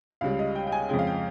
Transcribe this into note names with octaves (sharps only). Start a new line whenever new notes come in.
C#2 C#3 G3 F5
D#5
G5
G5
G#5
F2 C#3 G#3 G5
F5
G5